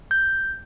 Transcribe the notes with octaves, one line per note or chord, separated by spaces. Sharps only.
G6